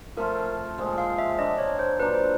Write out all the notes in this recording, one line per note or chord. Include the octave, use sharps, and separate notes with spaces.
F3 A3 C4 F4 A#4
A#2 F3 G#3 C4
F5
E5
F3 A#3 D4 D#5
C#5
C5
F#3 A#3 D4 F4 B4
C5